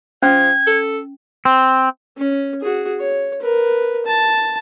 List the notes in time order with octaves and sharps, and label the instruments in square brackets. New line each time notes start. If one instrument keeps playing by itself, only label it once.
[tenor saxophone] F3 [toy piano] C#4 [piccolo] G#6
[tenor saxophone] A4
[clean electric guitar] C4
[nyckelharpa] C#4
F#4 G#4
C#5
A#4 B4
A5